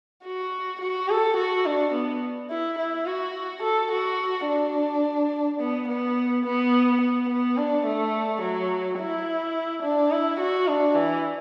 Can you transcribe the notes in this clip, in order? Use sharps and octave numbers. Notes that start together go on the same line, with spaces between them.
F#4
F#4
A4
F#4
D4
B3
E4
E4
F#4
A4
F#4
D4
B3
B3
B3
B3
B3
D4
A3
F#3
E4
D4
E4
F#4
D4
E3